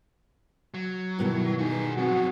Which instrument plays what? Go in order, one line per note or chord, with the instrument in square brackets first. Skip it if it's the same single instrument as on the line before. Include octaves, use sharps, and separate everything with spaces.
[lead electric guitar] F#3
[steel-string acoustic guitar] G2 B2 D#3 [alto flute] E4
[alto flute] D#4 [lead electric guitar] F#4 G#4
[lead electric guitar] F3 F#3 [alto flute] C4 [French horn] F#4